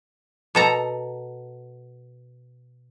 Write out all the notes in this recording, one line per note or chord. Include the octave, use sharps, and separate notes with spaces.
B2 A4 A#5